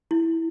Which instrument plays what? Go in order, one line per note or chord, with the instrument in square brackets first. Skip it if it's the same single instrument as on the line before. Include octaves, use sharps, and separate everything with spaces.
[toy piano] E4